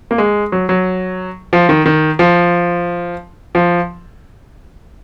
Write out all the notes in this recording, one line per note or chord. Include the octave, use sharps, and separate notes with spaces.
A#3
G#3
F#3
F#3
F3
D#3
D#3
F3
F3